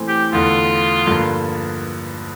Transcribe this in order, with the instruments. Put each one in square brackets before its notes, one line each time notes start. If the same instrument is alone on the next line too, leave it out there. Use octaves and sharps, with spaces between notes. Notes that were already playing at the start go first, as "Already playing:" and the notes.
Already playing: [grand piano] A2 E3 A3 C4
[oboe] G4
[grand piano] E2 D3 A3 [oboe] F4
[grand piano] G2 D3 F3 A#3